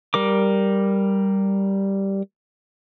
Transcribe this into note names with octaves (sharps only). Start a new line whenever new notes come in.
G3 A#4 D6